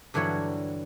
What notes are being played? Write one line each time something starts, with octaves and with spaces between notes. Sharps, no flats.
G2 D3 E3 F#3 C#5